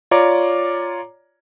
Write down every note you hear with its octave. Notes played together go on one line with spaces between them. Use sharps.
F4 C#5 D5 A#5 D6